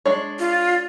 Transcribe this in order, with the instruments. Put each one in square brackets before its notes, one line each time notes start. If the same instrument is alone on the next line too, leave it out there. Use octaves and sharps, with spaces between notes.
[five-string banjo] G#3 D4 C#5
[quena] F4